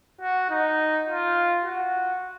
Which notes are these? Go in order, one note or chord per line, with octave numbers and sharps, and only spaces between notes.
F#4
D#4
F4
F#4